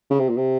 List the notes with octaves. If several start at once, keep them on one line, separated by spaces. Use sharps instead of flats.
C#3
C3
A#2
C3